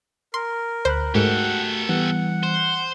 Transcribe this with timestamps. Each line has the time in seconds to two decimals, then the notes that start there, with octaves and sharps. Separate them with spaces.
0.34 A#4 C6
0.85 D2 C5 B5 F#6
1.15 G#2 A3 F#4 G4 A4 A#4 F#5
1.89 E3 G3 B3 F#5
2.43 C5